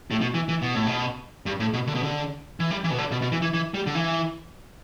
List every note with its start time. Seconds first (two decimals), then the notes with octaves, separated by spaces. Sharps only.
0.11 A2
0.21 B2
0.34 E3
0.49 E3
0.62 B2
0.75 A2
0.87 B2
1.46 G2
1.60 A2
1.73 B2
1.87 D3
1.95 B2
2.03 D3
2.60 E3
2.71 G3
2.84 E3
2.91 B2
2.98 D3
3.11 B2
3.22 B2
3.32 E3
3.42 E3
3.54 E3
3.74 G3
3.86 D3
3.95 E3